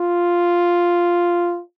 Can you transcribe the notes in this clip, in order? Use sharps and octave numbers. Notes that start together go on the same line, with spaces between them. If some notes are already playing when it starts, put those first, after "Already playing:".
Already playing: F4